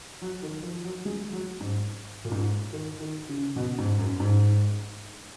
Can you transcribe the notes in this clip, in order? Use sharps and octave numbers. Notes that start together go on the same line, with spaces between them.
F#3
D#3
F3
F#3
G#3
F#3
G#2
A#2
G#2
D#3
D#3
C#3
B2
G#2
F#2
G#2